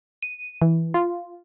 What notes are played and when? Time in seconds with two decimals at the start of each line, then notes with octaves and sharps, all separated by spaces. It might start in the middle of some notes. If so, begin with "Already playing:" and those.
0.23 D#7
0.62 E3
0.94 F4